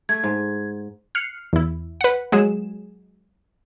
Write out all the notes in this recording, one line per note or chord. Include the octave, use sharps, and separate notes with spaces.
A3 G#6
G#2
F6 F#6 C7 C#7
E2 E4
B4 F#5
F#3 G#3 G#4 E7